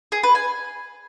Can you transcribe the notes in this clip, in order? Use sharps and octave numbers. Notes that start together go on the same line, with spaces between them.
G#4
B4
G#5